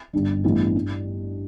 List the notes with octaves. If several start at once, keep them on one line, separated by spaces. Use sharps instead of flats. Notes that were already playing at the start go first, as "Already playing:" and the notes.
G1 G2 G3 D4
A1 G2 G3 B3 E4
G2 G3 D4